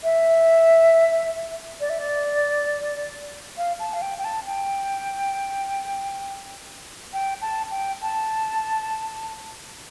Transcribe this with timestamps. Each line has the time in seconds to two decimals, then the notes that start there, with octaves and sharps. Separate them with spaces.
0.04 E5
1.81 D5
1.90 E5
1.99 D5
3.57 F5
3.80 A5
3.93 F5
4.02 G5
4.19 G5
4.24 A5
4.47 G5
7.13 G5
7.42 A5
7.71 G5
8.02 A5